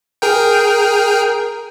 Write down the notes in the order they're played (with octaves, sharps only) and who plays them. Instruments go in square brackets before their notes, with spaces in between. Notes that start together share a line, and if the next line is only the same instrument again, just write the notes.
[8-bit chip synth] G#4 A#4 G5